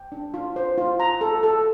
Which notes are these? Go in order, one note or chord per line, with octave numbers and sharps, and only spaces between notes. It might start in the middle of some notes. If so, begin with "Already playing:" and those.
Already playing: G5
D4
F4
C5
F4
A#5
A4
A4